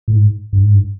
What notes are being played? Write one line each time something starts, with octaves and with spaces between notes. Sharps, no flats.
A2
G#2
G2
G#2
G2